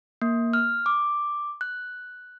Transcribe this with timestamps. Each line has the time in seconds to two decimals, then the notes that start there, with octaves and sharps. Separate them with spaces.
0.22 A#3
0.53 F6
0.86 D6
1.61 F#6